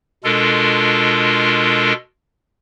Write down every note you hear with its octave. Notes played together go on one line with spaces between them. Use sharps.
B2 G#3 D4 F4 A4 A#4